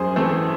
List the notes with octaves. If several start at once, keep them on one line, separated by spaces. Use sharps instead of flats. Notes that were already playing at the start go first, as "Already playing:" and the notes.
Already playing: F#2 G#4 C5
E3 A3 C4